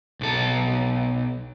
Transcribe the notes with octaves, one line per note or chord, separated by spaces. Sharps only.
B1 A4